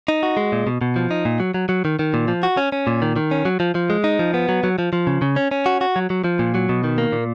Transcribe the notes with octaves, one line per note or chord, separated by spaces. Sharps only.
D#4
F#4
G#3
A#2
B2
B2
F3
D#4
A#2
F#3
F#3
F#3
D#3
D#3
A#2
F3
F#4
C#4
C#4
A#2
D#3
D#3
C#4
F#3
F3
F3
G#3
D#4
F3
B3
F#3
F#3
F3
F3
C#3
C#3
C#4
C#4
F#4
F#4
F#3
F#3
F3
A#2
F#3
B2
D#3
A#3
A#2